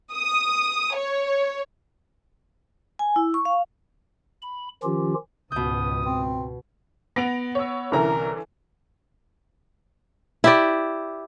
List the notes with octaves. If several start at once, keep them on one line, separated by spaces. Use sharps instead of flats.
D#6
C#5
G#5
E4
C#6
F5
B5
D#3 F3 C#4 F4 G4
C#2 G#2 B2 D#6 G6
C4
B3 A#6 D7 F7
C#5 E6
C2 D3 E3 C#4 A#4 A#5
E4 G4 D5